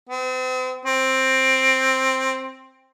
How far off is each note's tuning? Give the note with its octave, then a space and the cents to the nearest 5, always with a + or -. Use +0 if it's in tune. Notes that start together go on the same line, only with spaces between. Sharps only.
C4 -40
C4 +10